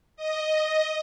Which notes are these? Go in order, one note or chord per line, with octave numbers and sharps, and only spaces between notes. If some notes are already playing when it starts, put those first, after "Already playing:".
D#5